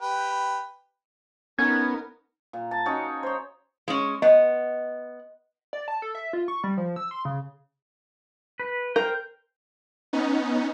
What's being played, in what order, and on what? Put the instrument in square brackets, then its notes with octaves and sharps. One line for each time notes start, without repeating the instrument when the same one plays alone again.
[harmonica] G4 B4
[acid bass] B3 [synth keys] C#4 [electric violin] D#4 A#4 [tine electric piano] G#6
[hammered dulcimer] A#2
A5
C#4 D#4 F#4 C#5
C5 C#5
[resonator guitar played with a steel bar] G#3 C#4
[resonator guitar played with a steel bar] B3 [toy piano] D#5
[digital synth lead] D5
A5
A4
E5
F4
C#6
G3
F3
E6
C6
C#3
[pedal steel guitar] B4
[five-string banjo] A#4 [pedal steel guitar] C5 G5
[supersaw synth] B3 C#4 D#4